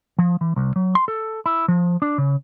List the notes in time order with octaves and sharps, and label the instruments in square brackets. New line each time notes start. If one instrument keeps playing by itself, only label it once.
[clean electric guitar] F3
E3
C2
F#3
C6
A4
E4
F3
D4
C#3